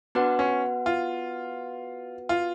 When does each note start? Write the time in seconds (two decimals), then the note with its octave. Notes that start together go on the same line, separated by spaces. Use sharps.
0.15 B3 D4 F#4 B4 F#5
0.39 C#4
0.86 F4
2.29 F4